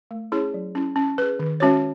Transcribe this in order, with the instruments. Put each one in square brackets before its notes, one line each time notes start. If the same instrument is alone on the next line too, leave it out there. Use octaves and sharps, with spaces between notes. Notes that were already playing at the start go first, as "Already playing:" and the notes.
[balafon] A3
C#4 E4 G#4 C#5
F#3
C#4 E4
C#4
G#4 B4
D#3
G#3 C#4 F#4 C#5